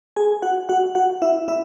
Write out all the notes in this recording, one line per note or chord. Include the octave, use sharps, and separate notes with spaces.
G#4 G#5
F#4 F#5
F#4 F#5
F#4 F#5
E4 E5
E4 E5